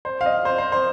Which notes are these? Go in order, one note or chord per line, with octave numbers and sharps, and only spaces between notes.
C5
F5
D#5
C5
C5
C5